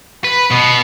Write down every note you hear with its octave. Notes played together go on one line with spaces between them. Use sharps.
B4
B2 B3